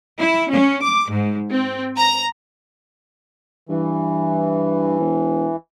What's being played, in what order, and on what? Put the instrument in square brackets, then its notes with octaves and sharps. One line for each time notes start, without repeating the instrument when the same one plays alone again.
[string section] E4
C#4
D6
G#2
C4
A#5
[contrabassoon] G2 [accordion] E3
[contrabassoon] E1